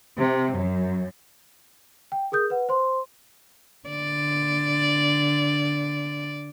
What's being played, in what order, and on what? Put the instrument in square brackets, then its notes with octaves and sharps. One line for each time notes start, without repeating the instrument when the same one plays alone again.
[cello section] C3
F#2
[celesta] G5
G#4 A#4 D#6 G6
B4 F#5
C5 C6
[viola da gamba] D3 D5